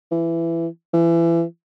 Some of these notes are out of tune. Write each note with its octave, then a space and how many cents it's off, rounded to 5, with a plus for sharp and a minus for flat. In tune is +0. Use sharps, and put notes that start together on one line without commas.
E3 +15
E3 +30